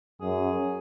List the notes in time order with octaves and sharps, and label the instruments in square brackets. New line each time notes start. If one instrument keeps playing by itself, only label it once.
[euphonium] F#2 [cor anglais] G#4